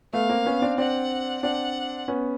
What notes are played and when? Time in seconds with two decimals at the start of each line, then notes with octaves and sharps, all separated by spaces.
0.13 A3 B3 F5
0.29 A#3 C4
0.45 B3 C#4
0.62 C4 D4
0.78 C4 D4 F#5
1.43 C4 D4 F#5
2.08 B3 C#4